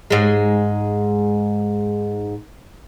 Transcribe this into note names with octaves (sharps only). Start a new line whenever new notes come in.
G#2 G#3